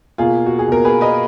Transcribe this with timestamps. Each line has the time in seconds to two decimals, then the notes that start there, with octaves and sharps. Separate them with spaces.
0.18 B2 A#3 F4 G#4
0.46 F#4
0.59 G#4
0.68 B2 A#3 A#4
0.85 G#4 B4
1.01 B4 D#5